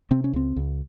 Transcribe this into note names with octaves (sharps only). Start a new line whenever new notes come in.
C3 C4
C#4
C#2 C4
C#2